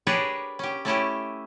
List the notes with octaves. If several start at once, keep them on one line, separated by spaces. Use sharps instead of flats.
D4 G4 G#4 A#4 B4 C#5
C#4 G4
A3 C#4 E4 G4